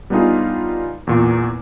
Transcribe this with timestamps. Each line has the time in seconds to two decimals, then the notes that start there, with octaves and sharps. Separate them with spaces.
0.10 G3 B3 D4 D#4 F4 G#4
1.07 E2 A#2